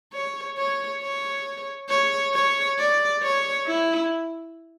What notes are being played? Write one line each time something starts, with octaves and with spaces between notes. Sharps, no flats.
C#5
C#5
C#5
C#5
C#5
D5
C#5
E4